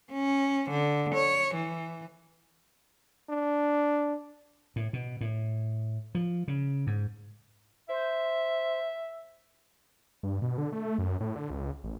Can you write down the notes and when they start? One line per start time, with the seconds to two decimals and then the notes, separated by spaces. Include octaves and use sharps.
0.12 C#4
0.70 D3
1.15 C#5
1.55 E3
3.30 D4
4.76 A2
4.93 B2
5.21 A2
6.15 F3
6.48 C#3
6.87 G#2
7.89 C5 E5
10.23 G2
10.42 B2
10.58 D3
10.72 A3
10.98 F#2
11.21 A2
11.36 D3
11.50 C#2
11.84 A1